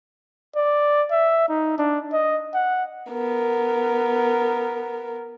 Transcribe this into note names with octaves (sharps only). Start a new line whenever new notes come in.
D5
E5
D#4
D4
D#5
F#5
B3 A#4